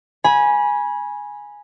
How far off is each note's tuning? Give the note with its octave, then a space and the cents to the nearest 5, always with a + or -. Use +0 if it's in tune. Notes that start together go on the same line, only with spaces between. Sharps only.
G#5 +0 B5 -30